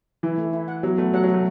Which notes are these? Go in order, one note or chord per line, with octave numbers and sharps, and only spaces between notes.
E3 E4
A3
E4
F#5
F#3 B3
A3 B3
F#3 F#5
F#3
A3 F#4